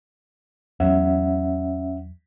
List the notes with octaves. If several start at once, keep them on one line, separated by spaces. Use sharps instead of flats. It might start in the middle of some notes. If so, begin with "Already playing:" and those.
E2 F#3 C#4 E5 F#5